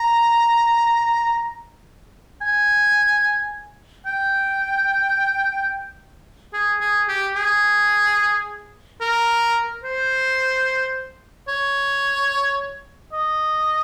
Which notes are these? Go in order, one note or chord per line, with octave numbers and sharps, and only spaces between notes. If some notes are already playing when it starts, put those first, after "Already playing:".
Already playing: A#5
G#5
G5
G#4
G#4
G4
G#4
A#4
C5
C#5
D#5